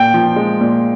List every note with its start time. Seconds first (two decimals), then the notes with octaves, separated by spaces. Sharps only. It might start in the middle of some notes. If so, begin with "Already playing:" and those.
Already playing: A#2 G5
0.14 F3
0.36 G#3
0.61 A#2